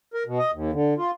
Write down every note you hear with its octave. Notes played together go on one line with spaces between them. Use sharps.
A#4
B2
D#5
D#2
D3
F4